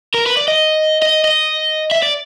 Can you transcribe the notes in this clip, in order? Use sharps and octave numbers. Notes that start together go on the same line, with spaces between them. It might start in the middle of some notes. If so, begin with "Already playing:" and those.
A#4
B4
D5
D#5
D#5
D#5
E5
D5